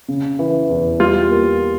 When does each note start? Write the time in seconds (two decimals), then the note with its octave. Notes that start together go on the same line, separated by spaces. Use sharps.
0.08 C#3
0.39 E3
0.69 E2
1.00 G3 F4
1.30 A#3